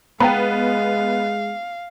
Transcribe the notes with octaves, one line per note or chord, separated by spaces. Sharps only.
G#3 B3 F5 G5 A#5 B5